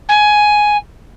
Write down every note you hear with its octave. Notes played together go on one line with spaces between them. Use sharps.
G#5